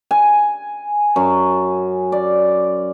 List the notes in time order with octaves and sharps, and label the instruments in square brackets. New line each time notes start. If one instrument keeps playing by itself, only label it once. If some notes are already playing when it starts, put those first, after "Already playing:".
[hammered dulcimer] G#5
F#2
D5